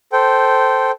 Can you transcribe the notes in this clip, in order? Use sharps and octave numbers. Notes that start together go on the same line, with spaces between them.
A4 C5 G5